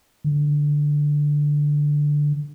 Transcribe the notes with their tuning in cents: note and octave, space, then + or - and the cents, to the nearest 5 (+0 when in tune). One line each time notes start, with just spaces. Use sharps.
D3 +0